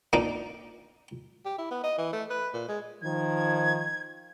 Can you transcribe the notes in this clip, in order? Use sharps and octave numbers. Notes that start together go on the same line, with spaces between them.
A#3 D4 D#4
G4
E4
B3
D#5
E3
A3
B4
A#2
G#3
D#3 F3 G#6